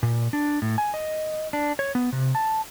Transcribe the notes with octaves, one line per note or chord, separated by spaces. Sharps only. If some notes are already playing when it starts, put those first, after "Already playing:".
A#2
D4
A2
G#5
D#5
D4
C#5
B3
C3
A5